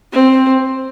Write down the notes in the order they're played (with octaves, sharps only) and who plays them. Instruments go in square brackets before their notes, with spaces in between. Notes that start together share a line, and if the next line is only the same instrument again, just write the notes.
[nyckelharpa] C4